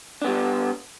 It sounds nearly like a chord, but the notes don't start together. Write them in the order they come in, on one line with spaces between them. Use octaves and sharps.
D4 B3 G3